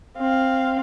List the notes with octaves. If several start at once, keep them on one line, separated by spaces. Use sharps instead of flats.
C4 F5